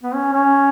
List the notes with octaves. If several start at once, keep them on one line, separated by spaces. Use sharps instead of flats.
B3
C#4
C#4